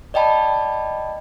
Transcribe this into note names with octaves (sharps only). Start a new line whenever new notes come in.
D5 D#5 G5 A5 B5